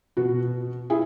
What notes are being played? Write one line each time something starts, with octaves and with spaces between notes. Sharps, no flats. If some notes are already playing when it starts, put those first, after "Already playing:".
B2 F#4
E4 G#4